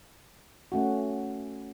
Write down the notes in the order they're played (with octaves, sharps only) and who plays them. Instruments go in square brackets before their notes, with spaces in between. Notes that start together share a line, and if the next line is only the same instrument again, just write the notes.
[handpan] A3 C#4 F#4